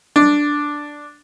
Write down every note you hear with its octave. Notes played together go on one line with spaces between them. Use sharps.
D4